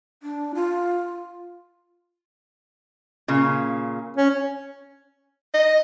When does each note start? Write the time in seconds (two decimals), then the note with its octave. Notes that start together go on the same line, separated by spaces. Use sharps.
0.23 D4
0.55 F4
3.28 A#2 C#3
4.17 C#4
5.54 D#5